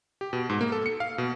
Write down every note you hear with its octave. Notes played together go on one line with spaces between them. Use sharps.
G4
B2
G#2
A#3
A4
C#7
F5
B2